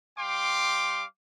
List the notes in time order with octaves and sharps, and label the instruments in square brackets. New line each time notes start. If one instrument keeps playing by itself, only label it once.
[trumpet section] G3 F5 G5 C6 D6